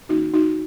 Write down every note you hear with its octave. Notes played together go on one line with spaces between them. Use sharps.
D#3 A#3 C#4 D#4 F#4
D#4 F#4